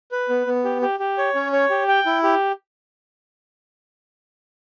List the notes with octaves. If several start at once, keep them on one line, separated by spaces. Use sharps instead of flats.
B4
B3
B3
G4
G4
G4
C#5
C#4
C#5
G4
G5
E4
G4